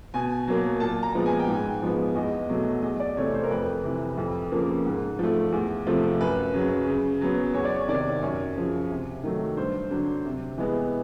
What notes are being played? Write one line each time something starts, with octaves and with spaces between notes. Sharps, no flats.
B2 G#5
F#3 A#3
A#2 A5
A#5
F3 G#3 B3
G#5
G5
G#2
G#5
F3 G#3 B3
E2 D#5
B2 F#3 A3
E2 D#5
D5
C3 E3 A3 C#5
C5
A#4
F2 B4
C3 E3
F2
C#3 F3 A#3
G#2
F3 A3
E2
C3 F3 A3
F#2 B4
C#3 F#3
C#3
F#3 B3
E2 C#5
D5
C#5
C3 D#3 D5
F#2 C#5
C#3 F3
C3
D#3 F#3 A3
G2 C5
D3 F#3
C3
E3 G#3 B3